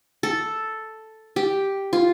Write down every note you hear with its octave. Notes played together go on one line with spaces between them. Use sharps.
A4
G4
F4